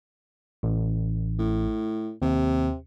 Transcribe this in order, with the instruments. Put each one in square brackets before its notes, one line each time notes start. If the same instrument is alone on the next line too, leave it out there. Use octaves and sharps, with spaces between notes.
[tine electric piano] A1
[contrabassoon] A2
[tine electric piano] D#2 [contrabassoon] C3